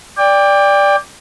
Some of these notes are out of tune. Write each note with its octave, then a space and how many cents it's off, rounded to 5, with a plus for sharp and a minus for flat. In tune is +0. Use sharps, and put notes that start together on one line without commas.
D5 -5 G5 +25